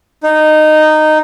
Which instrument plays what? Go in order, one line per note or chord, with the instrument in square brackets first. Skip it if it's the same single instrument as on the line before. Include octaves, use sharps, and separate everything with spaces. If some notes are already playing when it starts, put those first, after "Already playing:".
[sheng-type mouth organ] D#4